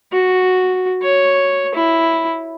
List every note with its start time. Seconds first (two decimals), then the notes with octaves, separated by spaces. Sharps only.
0.12 F#4
1.02 C#5
1.74 E4